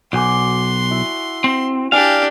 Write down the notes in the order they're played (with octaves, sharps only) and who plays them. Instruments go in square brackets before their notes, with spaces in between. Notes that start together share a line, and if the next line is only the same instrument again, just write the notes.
[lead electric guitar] B1 [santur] F#4 G#5 D6 [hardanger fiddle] C6
[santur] E4
[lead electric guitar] C4
[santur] G3 G#5 [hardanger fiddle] D4 G4 [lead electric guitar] F5